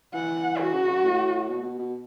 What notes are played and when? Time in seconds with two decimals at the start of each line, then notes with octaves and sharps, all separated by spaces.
0.14 E3 F#5
0.59 E3 F#4
0.73 C#3
0.88 F#2
1.04 A2
1.49 B2
1.63 B2
1.79 B2